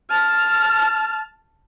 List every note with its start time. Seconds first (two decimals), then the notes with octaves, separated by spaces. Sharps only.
0.10 A5 F6